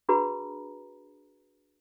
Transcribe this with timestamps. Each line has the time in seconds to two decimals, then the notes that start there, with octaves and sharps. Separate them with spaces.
0.09 D4 F#4 G#4 B4 A#5 B5